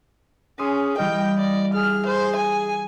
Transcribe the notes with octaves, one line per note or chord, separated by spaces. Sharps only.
C#4 G#4 C6 D#6 E6
E3 G3 D#5 F5 G5
D5
G#4 F6
C5
G#5